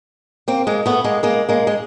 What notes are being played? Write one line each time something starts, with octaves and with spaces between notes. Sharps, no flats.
A#3 C4
G#3 A#3
A3 B3
G#3 A#3
G#3 A#3
G#3 A#3
G#3